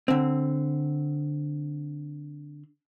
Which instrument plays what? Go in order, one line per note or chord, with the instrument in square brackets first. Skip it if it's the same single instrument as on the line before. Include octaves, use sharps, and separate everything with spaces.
[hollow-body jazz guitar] D3 C4